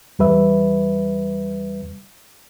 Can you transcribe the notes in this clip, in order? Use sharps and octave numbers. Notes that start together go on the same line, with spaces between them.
E2 G3 B4 E5